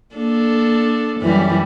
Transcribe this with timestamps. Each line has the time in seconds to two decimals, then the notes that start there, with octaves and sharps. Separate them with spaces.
0.15 A#3 D4 A4
1.21 F#2 E3 G3